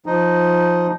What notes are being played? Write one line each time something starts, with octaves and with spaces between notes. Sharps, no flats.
F3 D#4